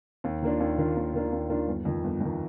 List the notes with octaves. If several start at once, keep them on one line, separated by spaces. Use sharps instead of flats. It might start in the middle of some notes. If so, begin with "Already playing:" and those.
D#2
D#3 A#3 D4 F4
D#2
D#3 A#3 D4 F4
D#2
D#3 A#3 D4 F4
D#2
D#3 A#3 D4 F4
G1
F2 D#3
G1
F2 D#3